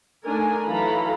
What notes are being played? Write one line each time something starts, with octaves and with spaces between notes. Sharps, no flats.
A3 D4 D#4 A#4 G#5
E3 F#3 A4 F5 A#5 B5